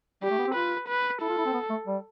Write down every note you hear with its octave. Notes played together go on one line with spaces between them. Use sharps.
G3 G4
A3
B3
C4
F4 B4
B4
E4 A4
F4
E4
C4
B3
A3
G3